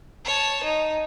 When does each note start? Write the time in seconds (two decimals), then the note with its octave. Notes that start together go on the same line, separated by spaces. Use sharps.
0.25 C#5 A5
0.63 D#4